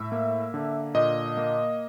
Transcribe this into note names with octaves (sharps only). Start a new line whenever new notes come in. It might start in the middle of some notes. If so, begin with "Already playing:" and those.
Already playing: A2 E5
A#3
D3
A#2 D#5
A#3